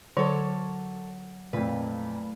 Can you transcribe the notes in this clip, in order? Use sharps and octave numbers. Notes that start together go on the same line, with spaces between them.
D3 F#3 A4 A#4 C#5 D6
F2 A#2 A3 A#3 E4 B4